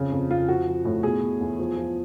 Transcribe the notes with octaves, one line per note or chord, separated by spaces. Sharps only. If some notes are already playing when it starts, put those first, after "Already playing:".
Already playing: F2 C#3
F2
F2 F4
F3 F#4
F3
A2
B2 G#4
B2
E2
F3
F3